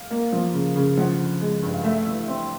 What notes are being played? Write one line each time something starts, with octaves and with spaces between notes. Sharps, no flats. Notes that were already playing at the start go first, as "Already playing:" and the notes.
Already playing: F5
A#3
F3
C#3
C#3
F3 F#5
D3
G#3
G2
F5
A3 E5
E3
C4